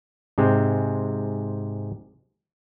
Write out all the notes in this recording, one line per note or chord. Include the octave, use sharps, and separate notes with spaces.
G#2 C3 G#3 C4